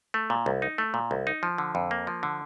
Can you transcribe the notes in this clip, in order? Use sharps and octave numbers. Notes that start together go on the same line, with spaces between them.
A3
A#2
C2
D#4
A3
A#2
C2
D#4
F3
D3
F2
A#3
F3
D3